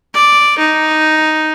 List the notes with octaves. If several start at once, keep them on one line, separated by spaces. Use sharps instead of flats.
D5
D#4